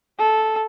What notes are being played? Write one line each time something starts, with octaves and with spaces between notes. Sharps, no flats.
A4